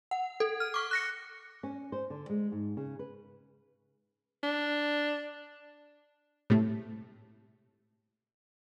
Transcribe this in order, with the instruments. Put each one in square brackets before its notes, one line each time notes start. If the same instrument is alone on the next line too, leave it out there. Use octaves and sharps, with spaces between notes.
[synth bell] F#5
A4
F6
C#6 D6
F#6 A#6 C#7
[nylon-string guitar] C#4
C5
D3
G#3
G#2
C#3
B4
[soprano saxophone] D4
[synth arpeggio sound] A2 C3 A3